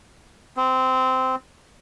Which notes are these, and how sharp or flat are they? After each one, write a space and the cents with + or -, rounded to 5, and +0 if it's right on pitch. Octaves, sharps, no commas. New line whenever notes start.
C4 -15